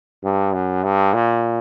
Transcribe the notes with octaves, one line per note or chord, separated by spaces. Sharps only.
G2
F#2
G2
A#2